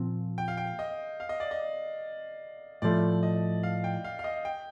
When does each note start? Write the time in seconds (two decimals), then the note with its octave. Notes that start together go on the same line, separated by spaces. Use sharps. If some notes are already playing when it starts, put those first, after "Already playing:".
Already playing: A#2 F3 C4
0.38 G5
0.48 F5
0.57 G5
0.79 D#5
1.20 F5
1.29 D#5
1.40 D5
1.51 D#5
2.82 A2 F3 A3 D5
3.23 D#5
3.63 F5
3.84 G5
4.04 F5
4.19 F5
4.24 D#5
4.45 G5